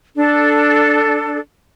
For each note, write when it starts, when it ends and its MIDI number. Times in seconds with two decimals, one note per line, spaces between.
0.15 1.38 62
0.15 1.38 69